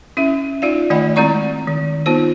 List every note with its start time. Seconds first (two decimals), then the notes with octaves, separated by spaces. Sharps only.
0.17 C#4 E4 E5
0.62 D#4 F4 D5 F5
0.90 D#3 A3 D5 D#5 F#5 B5
1.16 G#3 C4 E4 D5 A#5 C#6
1.68 D#3
2.06 B3 D#4 F4 C5